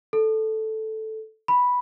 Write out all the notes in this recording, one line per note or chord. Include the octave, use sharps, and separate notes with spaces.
A4
B5